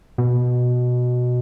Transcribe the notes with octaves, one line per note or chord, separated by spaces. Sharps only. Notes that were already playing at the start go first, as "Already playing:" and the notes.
B2